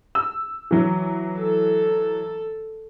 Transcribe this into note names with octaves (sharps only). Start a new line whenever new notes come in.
E6
E3 F#3
A4